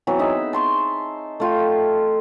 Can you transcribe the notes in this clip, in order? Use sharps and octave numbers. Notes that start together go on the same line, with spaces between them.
E3 F#3 B3 C4
D#4 G#4 E5
A5 C6 C#6
A3 F4 G5